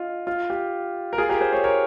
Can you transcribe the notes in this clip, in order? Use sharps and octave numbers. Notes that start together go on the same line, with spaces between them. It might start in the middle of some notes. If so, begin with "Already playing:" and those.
Already playing: F4 D#5
F4
G4
A#4
F4 G#4
G4 A#4
G#4 C5
A#4 C#5
A#4 C#5